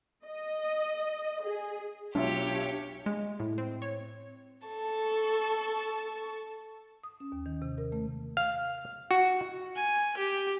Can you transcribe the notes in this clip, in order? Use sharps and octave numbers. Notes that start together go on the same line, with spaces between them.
D#5
G#4
B1 D4 F4 G4 C#5 E5
G#3
A2
C4
C#5
A4 A5 C#6
D#6
C#4
D#2
D#3
C3
A#4
A3
F5
F#4
G#5
G4